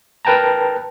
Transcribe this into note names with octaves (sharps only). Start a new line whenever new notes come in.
A#4 B4 G5 A5 A#5